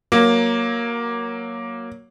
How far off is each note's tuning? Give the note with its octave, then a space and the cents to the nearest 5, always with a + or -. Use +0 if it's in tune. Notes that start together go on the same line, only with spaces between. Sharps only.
F#3 +0 A#3 +10